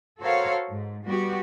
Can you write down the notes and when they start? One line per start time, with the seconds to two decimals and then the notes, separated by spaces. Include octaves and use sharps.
0.20 F#4 A4 A#4 C5 C#5 F5
0.69 G#2
1.05 G3 B3 F#4 G4